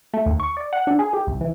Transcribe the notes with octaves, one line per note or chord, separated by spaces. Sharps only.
A3
D#2
C#6
D5
F#5
D4
G#4
G4
C2
E3